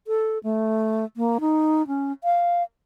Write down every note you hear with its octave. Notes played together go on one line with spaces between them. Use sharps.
A4
A3
A#3
D#4
C#4
F5